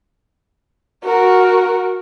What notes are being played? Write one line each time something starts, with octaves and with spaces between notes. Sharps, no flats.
F#4 A#4